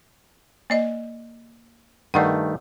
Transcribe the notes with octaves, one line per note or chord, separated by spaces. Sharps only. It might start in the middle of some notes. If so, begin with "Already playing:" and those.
A#3 D5 D#5
G2 D#3 A3 D5 F#5